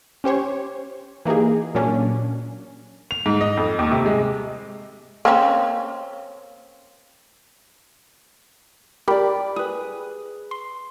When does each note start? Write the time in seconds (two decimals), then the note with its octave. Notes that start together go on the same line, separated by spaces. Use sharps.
0.24 C#4 G4 C5 C#5
1.25 E3 A#3 D#4 G4 G#4
1.75 A#2 F#3 A#3 C#4 D4
3.11 F7
3.26 G#2
3.41 D#5
3.57 F2
3.79 D#2
3.91 C3
4.06 G#3
5.25 A#3 C4 C#4
9.08 G4 A#4 D5 G5 B5
9.56 G#4 B4 D#6
10.51 C6